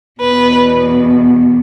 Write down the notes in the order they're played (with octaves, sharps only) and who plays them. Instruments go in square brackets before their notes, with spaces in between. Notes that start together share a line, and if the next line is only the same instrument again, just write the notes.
[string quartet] E2 B2 B4